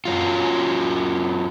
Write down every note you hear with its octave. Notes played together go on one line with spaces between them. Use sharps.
F#2 F#3 F4